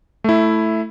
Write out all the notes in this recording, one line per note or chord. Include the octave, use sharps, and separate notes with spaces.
A3 E4